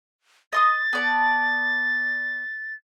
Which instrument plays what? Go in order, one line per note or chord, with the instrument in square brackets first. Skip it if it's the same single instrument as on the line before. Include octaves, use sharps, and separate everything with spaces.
[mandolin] D#5 C6 D#6 [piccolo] A6
[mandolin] B3 D5 A5